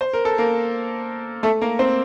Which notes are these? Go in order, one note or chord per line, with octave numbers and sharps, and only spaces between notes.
C5
A#4
A4
A#3 A#4
A3 A4
A#3 A#4
C4 C5